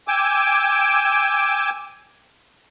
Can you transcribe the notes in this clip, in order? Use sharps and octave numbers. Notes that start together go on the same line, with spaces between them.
G5 G#5 D6 E6